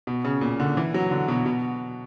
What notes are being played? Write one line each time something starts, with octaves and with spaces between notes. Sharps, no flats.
B2
C#3
A#2
D3
E3
F#3
D3
B2
B2